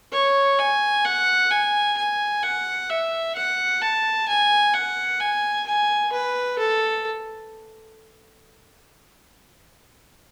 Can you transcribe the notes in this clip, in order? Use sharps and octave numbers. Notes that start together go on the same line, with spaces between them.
C#5
G#5
F#5
G#5
G#5
F#5
E5
F#5
A5
G#5
F#5
G#5
G#5
B4
A4